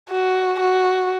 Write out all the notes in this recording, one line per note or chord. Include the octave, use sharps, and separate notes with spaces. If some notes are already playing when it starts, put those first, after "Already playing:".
F#4
F#4